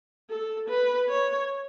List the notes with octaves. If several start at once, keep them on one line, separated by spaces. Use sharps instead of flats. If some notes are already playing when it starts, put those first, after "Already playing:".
A4
B4
C#5